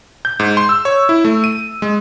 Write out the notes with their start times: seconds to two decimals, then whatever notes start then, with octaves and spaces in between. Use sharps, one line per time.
0.25 G6
0.40 G#2
0.57 C6
0.69 E6
0.85 C#5
1.09 E4
1.25 A3
1.44 D#7
1.82 G#3